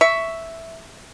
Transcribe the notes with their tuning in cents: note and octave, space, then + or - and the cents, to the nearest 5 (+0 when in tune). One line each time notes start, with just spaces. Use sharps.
E5 +0 C#6 +10